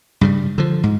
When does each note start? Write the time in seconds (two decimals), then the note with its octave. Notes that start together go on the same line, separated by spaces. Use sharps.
0.21 G2 C#3 G3
0.58 D3 F3
0.83 G#2